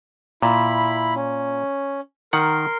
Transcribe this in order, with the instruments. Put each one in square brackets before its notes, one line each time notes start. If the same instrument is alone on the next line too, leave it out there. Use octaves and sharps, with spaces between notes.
[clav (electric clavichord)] A#2 [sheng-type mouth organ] E4 B5
[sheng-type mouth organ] C#4
[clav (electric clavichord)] D#3 F#5 [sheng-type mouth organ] A#4 C6